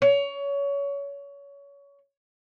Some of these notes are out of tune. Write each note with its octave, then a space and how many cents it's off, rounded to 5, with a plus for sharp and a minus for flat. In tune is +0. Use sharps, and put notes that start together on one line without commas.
C#5 +25